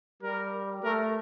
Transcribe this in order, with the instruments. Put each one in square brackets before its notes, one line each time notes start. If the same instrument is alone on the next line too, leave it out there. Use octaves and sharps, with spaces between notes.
[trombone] G3 [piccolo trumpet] A#4
[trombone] A3 [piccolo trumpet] A#4